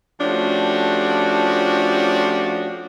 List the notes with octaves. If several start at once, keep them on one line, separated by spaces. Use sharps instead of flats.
F3 A3 C#4 D4 F#4 G4